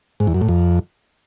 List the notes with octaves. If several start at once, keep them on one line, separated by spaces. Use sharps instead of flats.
G#2
E2
F#2
A2
F2